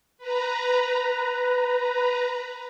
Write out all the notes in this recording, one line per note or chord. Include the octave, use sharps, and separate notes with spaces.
B4 A#5